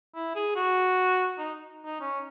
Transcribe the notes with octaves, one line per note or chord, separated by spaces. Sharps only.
E4
G#4
F#4
D#4
D#4
C#4